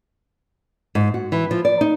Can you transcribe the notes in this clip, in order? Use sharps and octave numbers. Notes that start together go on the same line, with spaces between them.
G#2
F#4
E3
F3
D5
D#4